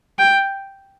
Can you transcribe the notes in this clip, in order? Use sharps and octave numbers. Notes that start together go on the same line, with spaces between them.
G5